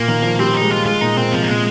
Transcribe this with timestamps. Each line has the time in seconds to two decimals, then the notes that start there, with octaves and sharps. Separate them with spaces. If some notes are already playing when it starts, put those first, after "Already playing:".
Already playing: A#2 A#3
0.08 D#3
0.23 F3
0.39 G3 C4
0.54 D#4
0.62 G#3
0.71 F4
0.85 G#3 F4
1.01 A#2 D#4
1.17 A#2 C4
1.32 C3 F3
1.43 A#3
1.49 A#2 G#3